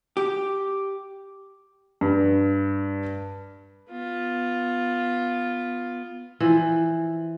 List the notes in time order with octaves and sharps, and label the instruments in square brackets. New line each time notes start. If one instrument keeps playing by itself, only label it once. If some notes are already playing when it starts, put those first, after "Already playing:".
[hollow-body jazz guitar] G4
[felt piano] G2
[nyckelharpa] B3 F4
[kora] E3 F3